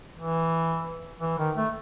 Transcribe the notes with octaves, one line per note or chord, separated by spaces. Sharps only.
E3
E3
D#3
A3